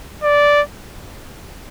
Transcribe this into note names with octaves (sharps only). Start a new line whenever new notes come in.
D5